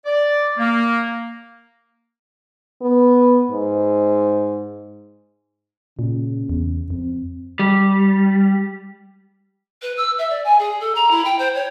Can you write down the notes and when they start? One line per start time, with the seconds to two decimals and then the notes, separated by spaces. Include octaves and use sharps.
0.06 D5
0.58 A#3
2.82 B3
3.52 G#2
5.99 A#2 C#3
6.49 E2
6.90 F2 C4
7.59 G3
9.82 B4
9.97 E6
10.18 E5
10.30 D5
10.44 G#5
10.59 G#4
10.80 A4
10.95 A#5
11.11 E4
11.25 G5
11.38 C5
11.55 C#5